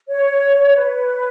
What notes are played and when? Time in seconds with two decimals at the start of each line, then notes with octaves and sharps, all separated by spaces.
0.08 C#5
0.74 B4